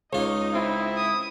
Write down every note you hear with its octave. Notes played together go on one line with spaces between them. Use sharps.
C#2 D#4 F4 C#5 D#5
C4 E4
D#6